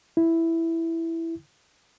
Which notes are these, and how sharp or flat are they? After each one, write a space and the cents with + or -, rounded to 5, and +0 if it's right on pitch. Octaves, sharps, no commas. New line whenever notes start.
E4 +0